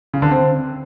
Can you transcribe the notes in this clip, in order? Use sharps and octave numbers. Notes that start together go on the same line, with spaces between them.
C#3
D3
C4